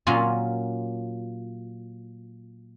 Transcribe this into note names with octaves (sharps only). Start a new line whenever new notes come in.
A#2 F#3 C#4 F4